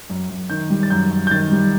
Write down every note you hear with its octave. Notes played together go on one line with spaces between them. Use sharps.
F#2
F#2
D#3 G6
G3
A6
F#2 G6
F#2
G6
D#3 A6
G3